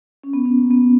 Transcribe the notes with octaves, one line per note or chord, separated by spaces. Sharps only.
C#4
B3
C#4
A#3
B3